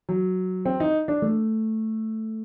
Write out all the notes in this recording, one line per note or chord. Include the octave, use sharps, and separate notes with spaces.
F#3
C4
D#4
D4
A3